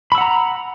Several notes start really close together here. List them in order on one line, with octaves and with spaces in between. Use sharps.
B5 E6 F#5 A#5